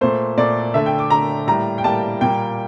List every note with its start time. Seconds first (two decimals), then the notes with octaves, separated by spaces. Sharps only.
0.01 A#2 A3 C5
0.38 A#2 A3 D5
0.74 D3 A3 E5
0.86 G5
0.99 D6
1.10 D3 A3 A#5
1.47 A2 G3 A#3 A#5
1.78 G5
1.84 A2 G3 A#3 A5
2.21 A#2 G3 A#3 G5